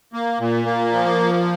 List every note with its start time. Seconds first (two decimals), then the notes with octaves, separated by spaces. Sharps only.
0.13 A#3
0.40 A#2
0.65 A#3
0.92 F3